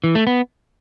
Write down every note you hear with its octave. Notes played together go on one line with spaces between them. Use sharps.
E3
A3
B3